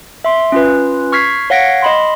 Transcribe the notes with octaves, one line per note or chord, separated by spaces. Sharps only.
E5 C6
C#4 F4 B4
C#6 F6 G#6 B6 C7
C#5 F5 F#5 A#6 B6 D7
D#5 B5 C6